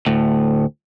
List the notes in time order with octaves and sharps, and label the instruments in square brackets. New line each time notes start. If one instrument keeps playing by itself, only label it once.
[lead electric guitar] D2 A2